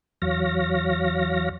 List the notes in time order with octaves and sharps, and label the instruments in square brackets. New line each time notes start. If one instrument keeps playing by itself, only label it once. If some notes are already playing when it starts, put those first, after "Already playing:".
[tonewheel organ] E2 F#3 C#5 F5 A#6